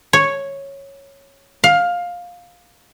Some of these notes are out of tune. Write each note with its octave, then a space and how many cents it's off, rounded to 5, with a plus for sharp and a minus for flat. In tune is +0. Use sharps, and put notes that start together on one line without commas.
C#5 -5
F5 +15